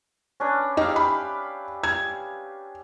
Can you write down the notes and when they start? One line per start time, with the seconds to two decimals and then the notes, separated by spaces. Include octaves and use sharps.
0.40 C#4 D4 B4
0.77 D#4 G4 E5 F5
0.96 B5
1.84 G#6